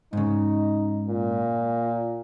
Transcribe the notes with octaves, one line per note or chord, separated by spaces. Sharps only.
G#2 C#3 D#4
A#2